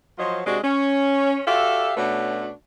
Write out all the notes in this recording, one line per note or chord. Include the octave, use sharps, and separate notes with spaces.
F3 F#3 F4 C5 C#5 D#5
C3 G#3 D4 F#4 D5 D#5
C#4
F#4 G4 A4 D5 E5 F5
B2 A3 C#4 D4 F#4 B4